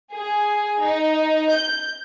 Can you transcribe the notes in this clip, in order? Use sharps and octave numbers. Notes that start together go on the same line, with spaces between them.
G#4
D#4
G6